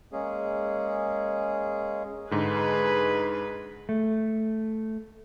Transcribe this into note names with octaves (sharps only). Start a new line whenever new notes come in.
G#3 A#3 C#4 G#4
G#2 D3 G#4 B4
A3